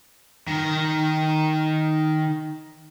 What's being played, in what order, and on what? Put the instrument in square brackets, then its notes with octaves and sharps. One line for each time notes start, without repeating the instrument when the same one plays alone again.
[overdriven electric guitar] D#3 A#4